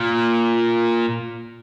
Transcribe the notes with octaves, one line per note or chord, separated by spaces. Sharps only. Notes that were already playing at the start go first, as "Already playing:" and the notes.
Already playing: A#2